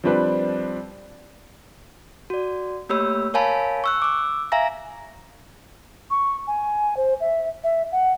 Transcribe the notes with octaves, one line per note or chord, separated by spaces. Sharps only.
F3 G3 C4 D4 B4
F#4 D5
A3 A#3 G4 C#5 B5 E6
A#4 C#5 F5 G#5 A5 B5
C#6 E6 F#6
D6 E6
E5 F5 G#5 A#5 A#6
C#6
G#5
C5
E5
E5
F#5